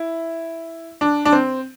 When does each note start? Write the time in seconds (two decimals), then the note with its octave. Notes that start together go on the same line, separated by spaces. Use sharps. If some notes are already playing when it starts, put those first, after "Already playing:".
Already playing: E4
1.01 D4
1.25 D4
1.33 C4